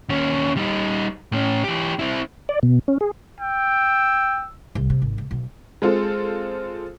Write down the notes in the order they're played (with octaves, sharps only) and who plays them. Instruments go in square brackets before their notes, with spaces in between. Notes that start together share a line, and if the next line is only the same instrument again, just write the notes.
[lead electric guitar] D#2 C#4
G3 D#4
A2 C#4
E3 G4
C4 E4
[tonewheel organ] D5
B2
C#4
G#4
[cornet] G5 [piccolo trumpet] E6
[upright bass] C2
C3
G#1
C#2
B1
[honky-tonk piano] G#3 C4 F4 A4